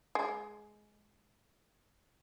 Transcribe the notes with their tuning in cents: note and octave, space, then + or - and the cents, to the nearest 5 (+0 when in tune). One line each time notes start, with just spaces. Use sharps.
G#3 +15